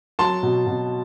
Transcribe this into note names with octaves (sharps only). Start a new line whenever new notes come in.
F#3 A5 C6
B2
B2